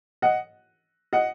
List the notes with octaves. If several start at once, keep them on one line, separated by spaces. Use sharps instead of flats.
D#5 F#5
D#5 F#5